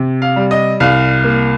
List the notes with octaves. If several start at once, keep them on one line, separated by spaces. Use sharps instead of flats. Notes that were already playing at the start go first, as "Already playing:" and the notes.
Already playing: C3
F5
G3
D#5
C2 F5
A#3